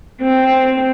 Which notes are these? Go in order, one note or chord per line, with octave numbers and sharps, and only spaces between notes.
C4